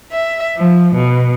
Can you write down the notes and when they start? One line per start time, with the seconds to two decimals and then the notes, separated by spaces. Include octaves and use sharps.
0.12 E5
0.56 F3
0.96 B2